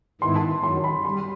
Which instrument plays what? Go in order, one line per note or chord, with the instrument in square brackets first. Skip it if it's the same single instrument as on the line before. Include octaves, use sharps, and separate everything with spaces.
[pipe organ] G#2 D#3 G#3 B3 E4 [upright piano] C6
[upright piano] A5
[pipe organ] F#2 D#3 F#3 [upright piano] C6
[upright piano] B5
[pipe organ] G3 [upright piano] C6